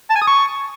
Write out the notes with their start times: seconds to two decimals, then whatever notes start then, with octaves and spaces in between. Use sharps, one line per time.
0.10 A5
0.15 G#5
0.21 D#6
0.27 C#6